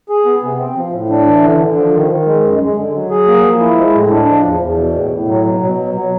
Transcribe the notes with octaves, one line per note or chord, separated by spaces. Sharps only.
G#4
B3
C3
C4
F3
A2
D4
E3
D3
D3
F3
D#3
D#3
G#3
F#2
G#3
D3
F#3
G#4
A#3
F3
E4
G#3
A2
D4
F3
E2
E2
B2
A2
A2
F#3
B2
B2
F#3
F#3